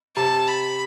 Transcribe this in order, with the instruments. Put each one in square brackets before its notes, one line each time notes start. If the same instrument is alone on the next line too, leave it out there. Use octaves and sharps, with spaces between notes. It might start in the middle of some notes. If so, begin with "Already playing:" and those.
[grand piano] C3 [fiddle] A5
[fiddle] B5